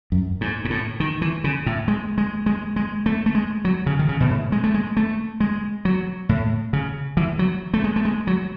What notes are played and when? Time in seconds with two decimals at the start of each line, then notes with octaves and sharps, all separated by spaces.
0.12 F#2
0.41 G#2
0.65 G#2
0.70 A2
1.00 D#3
1.22 E3
1.44 C#3
1.66 A2
1.88 G#3
2.18 G#3
2.46 G#3
2.76 G#3
3.06 A3
3.26 A3
3.35 G#3
3.65 F#3
3.86 C#3
3.99 D#3
4.09 C#3
4.20 B2
4.31 A2
4.52 G#3
4.64 A3
4.74 G#3
4.97 A3
5.40 G#3
5.85 F#3
6.29 A2
6.73 C#3
7.17 E3
7.39 F#3
7.74 A3
7.84 G#3
7.96 A3
8.05 G#3
8.27 F#3